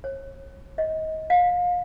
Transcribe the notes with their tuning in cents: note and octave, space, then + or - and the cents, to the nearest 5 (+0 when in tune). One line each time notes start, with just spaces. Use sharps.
C#5 -35
D#5 +25
F5 +30